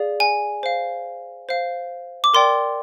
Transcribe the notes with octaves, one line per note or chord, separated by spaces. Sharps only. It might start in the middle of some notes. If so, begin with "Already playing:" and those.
Already playing: G#4 D5 F5
G#5
C5 F5
C5 F5
D6
A#4 D5 G5 C6